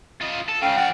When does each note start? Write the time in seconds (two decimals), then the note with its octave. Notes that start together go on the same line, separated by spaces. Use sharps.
0.21 F4 D#5
0.49 A4
0.62 C#2 C#3 F5 G5
0.77 F3 D5 F#5